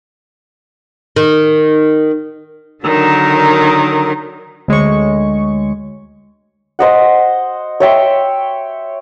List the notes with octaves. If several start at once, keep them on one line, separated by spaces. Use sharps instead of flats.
D#3
D3 D#3 F#3 A#4
D2 G#3 C#5 C#6
C5 D#5 F#5
C#5 E5 G5 C6